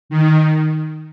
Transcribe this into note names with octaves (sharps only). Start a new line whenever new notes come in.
D#3